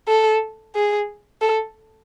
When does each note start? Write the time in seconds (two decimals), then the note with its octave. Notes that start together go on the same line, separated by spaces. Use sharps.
0.08 A4
0.75 G#4
1.41 A4